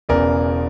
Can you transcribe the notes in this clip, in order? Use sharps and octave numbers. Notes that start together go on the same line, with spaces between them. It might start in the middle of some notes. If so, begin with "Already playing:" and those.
E1 E2 C#3 E3 A#4 D5